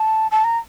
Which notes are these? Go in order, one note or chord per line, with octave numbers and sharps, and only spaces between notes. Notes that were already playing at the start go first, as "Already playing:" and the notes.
Already playing: A5
A5
A#5